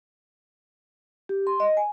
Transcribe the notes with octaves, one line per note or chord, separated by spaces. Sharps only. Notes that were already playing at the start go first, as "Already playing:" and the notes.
G4
C6
D#5
G#5